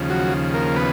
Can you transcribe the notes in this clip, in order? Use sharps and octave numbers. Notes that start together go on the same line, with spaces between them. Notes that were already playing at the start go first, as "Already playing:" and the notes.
Already playing: D#2 C#3 F3
F#3 F#4
A#3 A#4
B3 B4